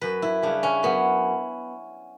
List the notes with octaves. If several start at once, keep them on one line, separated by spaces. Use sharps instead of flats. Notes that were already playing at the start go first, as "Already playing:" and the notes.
F#2 B4
E4
C#3 G3 D4
C#4
F#2 B3